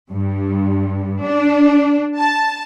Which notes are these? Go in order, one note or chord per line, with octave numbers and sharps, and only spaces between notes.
G2
D4
A5